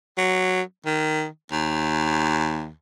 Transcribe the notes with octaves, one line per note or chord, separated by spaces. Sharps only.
F#3
D#3
D#2